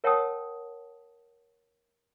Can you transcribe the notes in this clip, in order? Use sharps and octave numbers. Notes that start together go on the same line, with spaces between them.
A#4 C#5 F#5 G5 A5 D#6